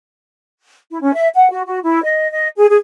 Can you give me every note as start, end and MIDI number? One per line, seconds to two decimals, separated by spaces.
0.89 0.97 64
1.02 1.10 61
1.14 1.28 76
1.35 1.48 78
1.50 1.62 66
1.66 1.78 66
1.82 2.02 64
2.03 2.29 75
2.30 2.48 75
2.56 2.66 68
2.70 2.77 68